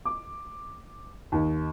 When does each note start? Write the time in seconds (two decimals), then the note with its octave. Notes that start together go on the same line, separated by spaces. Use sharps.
0.05 D6
1.32 D#2